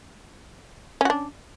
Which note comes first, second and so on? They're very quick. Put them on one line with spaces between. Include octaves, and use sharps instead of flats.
C#4 F#4 D4